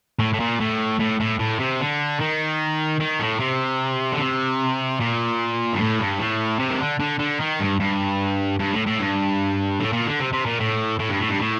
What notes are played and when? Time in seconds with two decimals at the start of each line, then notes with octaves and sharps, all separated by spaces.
0.19 A2
0.34 A2
0.40 A#2
0.60 A2
1.00 A2
1.20 A2
1.39 A2
1.59 C3
1.80 D3
2.20 D#3
3.00 D#3
3.19 A2
3.40 C3
4.12 D3
4.20 C3
5.00 A#2
5.73 G2
5.80 A2
6.00 G2
6.19 A2
6.59 C3
6.70 D#3
6.80 D3
7.00 D3
7.19 D3
7.40 D#3
7.60 G2
7.80 G2
8.60 G2
8.73 A2
8.87 A2
9.00 G2
9.80 A2
9.93 A#2
10.06 D3
10.20 C3
10.33 C3
10.46 A#2
10.60 A2
10.99 A2
11.10 G2
11.20 A2
11.29 G2
11.39 A2